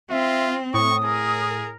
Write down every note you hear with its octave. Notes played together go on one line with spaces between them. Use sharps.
C4 F4 E5
A2 C#6 D#6
G#4 A#4